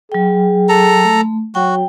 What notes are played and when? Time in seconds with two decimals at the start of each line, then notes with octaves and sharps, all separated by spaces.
0.12 F#3 G#4 G5
0.69 A4 A#5
1.05 A3
1.55 F#3 F#4 G5